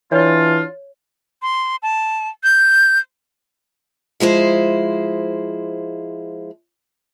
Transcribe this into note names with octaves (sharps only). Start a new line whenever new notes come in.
E3 D4 F4 C#5
C6
A5
G6
F3 G#3 E4 C5